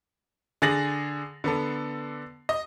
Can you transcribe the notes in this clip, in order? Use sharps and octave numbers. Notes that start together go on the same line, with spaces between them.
D3 G#4 A6 A#6 F#7
D3 B3 A4
D#5